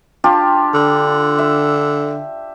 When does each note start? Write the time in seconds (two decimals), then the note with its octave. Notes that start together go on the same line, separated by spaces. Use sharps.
0.24 D4 F4 G4
0.74 D3
1.39 E5